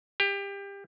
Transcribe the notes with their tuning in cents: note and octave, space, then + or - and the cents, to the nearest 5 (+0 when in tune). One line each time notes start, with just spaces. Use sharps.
G4 +25